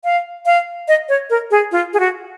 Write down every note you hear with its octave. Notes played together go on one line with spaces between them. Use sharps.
F5
F5
D#5
C#5
A#4
G#4
F4
G#4
F#4